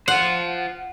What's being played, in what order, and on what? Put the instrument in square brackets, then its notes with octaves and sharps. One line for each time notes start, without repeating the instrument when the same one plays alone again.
[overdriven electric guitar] F4 C5 [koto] F#5